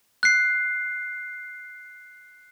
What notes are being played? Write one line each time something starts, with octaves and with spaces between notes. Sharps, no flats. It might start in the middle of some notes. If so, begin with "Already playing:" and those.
F#6 C7